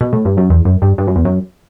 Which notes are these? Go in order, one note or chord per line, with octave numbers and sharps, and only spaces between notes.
B2
A2
G2
F#2
E2
F#2
G2
G2
F#2
E2
F#2